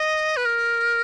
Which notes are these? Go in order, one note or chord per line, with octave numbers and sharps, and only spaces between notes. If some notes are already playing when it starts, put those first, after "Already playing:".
Already playing: D#5
B4
A#4